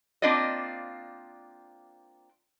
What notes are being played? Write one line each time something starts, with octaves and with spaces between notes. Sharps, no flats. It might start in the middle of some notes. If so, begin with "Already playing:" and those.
A#3 C4 D4 F4 D5 D#5